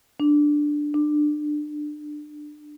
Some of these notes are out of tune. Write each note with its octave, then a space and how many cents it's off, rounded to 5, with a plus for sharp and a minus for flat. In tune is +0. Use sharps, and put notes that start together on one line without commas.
D4 +5
D4 +25